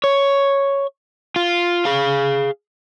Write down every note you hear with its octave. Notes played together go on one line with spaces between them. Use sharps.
C#5
F4
G#4 F5